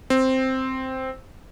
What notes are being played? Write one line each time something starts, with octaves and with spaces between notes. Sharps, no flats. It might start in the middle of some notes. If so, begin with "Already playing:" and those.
C4